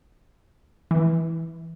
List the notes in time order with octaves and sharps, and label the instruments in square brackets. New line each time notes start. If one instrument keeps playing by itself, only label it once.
[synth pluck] E3